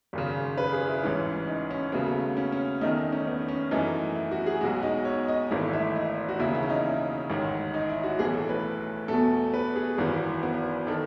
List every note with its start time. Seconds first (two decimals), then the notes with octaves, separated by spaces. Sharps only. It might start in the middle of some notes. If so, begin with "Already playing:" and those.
0.13 G#1 F#2 C#3
0.57 B4
0.73 G#4
0.88 E4
1.03 A1 G#2 E3 C#4
1.47 D#4
1.71 C#4
1.92 D#2 C#3 F#3 A3 B3
2.37 C#4
2.52 C#4
2.81 E2 D#3 A3 D#4
2.97 D#4
3.12 C#4
3.27 B3
3.48 C#4
3.71 F#2 E3 A3 D#4
4.16 E4
4.31 F#4
4.46 G#4
4.61 B1 B2 G#3 F#4
4.83 D#4
5.05 C#5
5.28 D#5
5.51 G#1 G#2 E3 A3
5.73 E5
5.95 D#5
6.29 F#4
6.39 E1 D#2 C#3 E4
6.55 E4
6.63 C#4
6.70 D#4
7.30 A1 G#2 D#3
7.74 D#4
7.89 E4
8.03 F#4
8.19 B1 A2 E3 A3 G#4
8.33 A4
8.49 B4
9.08 E2 B2 A3 A4
9.54 B4
9.76 G#4
9.98 G#1 F#2 E3 F#4
10.43 B3
10.87 D#3 A4